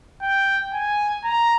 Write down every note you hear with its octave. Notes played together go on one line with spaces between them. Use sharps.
G5
G#5
A#5